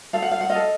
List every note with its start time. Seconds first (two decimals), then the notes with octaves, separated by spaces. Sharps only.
0.13 A4 F5
0.22 F#5
0.31 F5
0.41 F#5
0.50 D#5 F5
0.55 A4